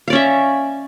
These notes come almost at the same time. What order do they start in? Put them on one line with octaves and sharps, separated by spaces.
F5 D5 C#4 E5